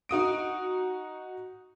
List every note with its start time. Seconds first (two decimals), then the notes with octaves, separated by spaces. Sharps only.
0.09 D#4 F#4 D#6 D7